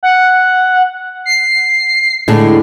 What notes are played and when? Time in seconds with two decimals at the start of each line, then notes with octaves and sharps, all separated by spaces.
0.03 F#5
1.25 C7
2.28 A2 D3 G#3